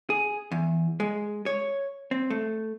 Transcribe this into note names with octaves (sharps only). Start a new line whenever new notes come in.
G#4
E2
G#3
C#5
C4
A3